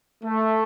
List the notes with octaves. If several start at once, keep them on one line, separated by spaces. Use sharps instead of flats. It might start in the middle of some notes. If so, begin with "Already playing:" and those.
A3